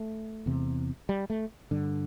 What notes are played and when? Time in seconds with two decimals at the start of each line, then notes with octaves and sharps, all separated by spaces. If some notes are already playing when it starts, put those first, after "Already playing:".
Already playing: A3
0.46 E2 C3
1.09 G3
1.30 A3
1.71 G2 D3